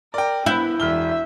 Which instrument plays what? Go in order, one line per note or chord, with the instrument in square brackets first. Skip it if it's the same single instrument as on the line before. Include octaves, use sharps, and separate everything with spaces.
[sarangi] A#4 [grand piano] D5 G5
[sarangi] B3 [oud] E4 [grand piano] F#6 G6
[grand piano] E1 F6 G7 [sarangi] E5